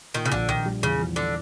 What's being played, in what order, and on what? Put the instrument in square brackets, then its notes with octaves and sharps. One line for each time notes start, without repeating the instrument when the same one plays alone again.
[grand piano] A#2 [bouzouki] D#3
[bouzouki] C#3
[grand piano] A#1 [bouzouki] D3
[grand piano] A#1 [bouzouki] D#3
[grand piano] G3
[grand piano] E2 [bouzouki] C#3
[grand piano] F3
[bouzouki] D3